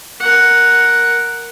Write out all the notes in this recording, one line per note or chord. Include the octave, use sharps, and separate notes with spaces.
A#4 F#5